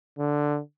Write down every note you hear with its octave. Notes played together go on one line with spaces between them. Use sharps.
D3